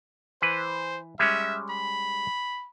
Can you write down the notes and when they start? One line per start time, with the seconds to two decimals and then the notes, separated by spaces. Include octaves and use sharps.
0.42 E3 B4 C5
1.19 G3 G#3 C#4 E5
1.70 B5